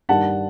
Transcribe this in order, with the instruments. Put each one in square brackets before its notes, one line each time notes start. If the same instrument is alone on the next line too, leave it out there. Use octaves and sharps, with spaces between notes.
[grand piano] G2 D#3 G3 F#5 A5